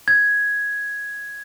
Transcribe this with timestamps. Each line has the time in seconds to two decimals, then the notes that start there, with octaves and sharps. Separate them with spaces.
0.08 G#6